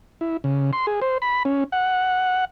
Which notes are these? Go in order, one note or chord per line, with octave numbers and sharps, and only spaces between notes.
E4
C#3
C6
G#4
C5
B5
C#4
F#5